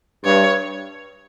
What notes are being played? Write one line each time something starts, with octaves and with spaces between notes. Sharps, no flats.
G2 C#5